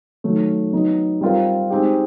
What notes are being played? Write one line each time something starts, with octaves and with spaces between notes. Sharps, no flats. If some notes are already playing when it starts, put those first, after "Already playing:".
D#3 F#3 A3
F#3 B3 D#4
G3 C4 F4 A#4
G#3 C4 D#4 G4